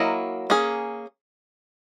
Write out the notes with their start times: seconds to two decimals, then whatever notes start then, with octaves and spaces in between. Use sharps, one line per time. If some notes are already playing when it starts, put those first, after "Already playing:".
Already playing: F#3 A#3 E4 A#4 D#5
0.50 A#3 C#4 G#4